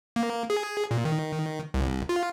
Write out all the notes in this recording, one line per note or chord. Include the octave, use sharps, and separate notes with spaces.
A#3
G#4
A#2
D#3
C2
F4